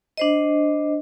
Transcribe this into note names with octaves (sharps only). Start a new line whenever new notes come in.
D4 C5 D#5